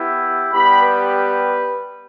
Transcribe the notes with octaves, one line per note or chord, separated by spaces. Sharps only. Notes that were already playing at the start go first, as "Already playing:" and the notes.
Already playing: B3 E4 G4
G3 B3 G4 B5
B4